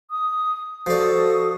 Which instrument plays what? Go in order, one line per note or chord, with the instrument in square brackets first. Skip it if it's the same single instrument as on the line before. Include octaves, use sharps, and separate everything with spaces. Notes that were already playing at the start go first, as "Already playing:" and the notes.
[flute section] D#6
[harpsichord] F3 D5 [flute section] F#4 A4 D#6